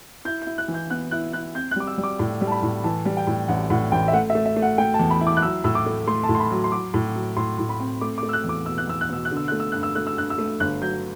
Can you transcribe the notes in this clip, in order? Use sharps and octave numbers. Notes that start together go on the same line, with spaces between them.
E4 G6
G6
E4
F#6
E3
G6
B3 F#6
E4 F#6
E4 F#6
C4 G6
F#6
G3 D6
E6
G3
D6
A2
G3
A5
B5
A2
E3 A5
G3
G5
A2
A1 F#5
A2 F#5
A1 G5
E5
A3 F#5
E5
A3
E5
A3
F#5
A3 G5
A5
E2
B5
E4
D6
F#6
F#3 E6
A2 E6
D6
A3
A3 C6
A5
A2
C6
B5
F#3
C6
F#3 D6
A2
F#3
A2 C6
A2
B5
C4
A3 D6
D6
A3
E6
F#6
E2
D6
B2 E6
F#6
E2 E6
F#6
B2 E6
F#6
D3
E6
A3 F#6
E6
G2 F#6
E6
A3 F#6
E6
G2 F#6
E6
A3
G1 F#6
F#3 G6